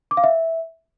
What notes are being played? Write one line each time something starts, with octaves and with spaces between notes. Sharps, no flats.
D6
F5
E5